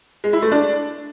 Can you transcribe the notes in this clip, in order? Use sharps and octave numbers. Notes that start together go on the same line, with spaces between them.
G#3
E4
A3
D4